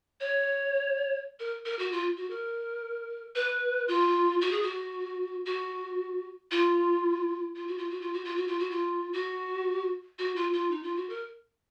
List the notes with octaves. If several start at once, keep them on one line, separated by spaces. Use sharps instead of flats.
C#5
A#4
A#4
F#4
F4
F#4
A#4
B4
F4
F#4
G#4
F#4
F#4
F4
F4
F#4
F4
F#4
F4
F#4
F4
F#4
F4
F#4
F4
F#4
F#4
F4
F4
D#4
F4
F#4
A#4